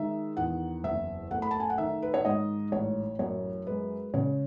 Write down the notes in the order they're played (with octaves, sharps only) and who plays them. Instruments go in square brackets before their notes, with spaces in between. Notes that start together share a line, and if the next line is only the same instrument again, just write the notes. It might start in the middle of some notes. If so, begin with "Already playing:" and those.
Already playing: [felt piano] D#3 G#3 E5
E2 F#5
F#1 E5
A3 F#5
B5
A5
G#5
F#5
D#3 E5
B4
C#5
G#2 D#5
A1 C#5
F#2 C#5
G#3 B4
C#3 C#5